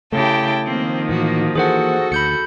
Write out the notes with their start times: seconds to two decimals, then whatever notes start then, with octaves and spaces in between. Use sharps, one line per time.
0.12 C#3 A3 E4 G4 G5 A5
0.65 D#3 F3 A#3 C4
1.09 A2 E3 A#3 F#4
1.55 E3 A#3 F#4 G#4 A4 C5 F#5
2.12 D2 B5 G6 C#7